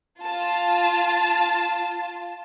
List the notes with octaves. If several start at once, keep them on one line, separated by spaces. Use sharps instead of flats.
F4 A5